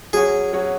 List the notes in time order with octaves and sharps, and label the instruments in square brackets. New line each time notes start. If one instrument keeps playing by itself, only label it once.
[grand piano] F#3 C#4 F#4 C#5 [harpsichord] G#4
[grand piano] F#3 C#4 F#4 C#5